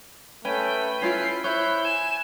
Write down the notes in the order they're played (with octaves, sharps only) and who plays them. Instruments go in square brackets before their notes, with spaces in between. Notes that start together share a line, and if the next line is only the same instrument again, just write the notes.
[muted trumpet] A3 [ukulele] C#4 [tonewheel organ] B4 G5
[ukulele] C#4 F4 F5 [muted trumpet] E4 [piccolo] C7
[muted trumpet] E4 [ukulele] C5 C#5 [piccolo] F#6 [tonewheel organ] G6
[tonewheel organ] G#5 [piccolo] E7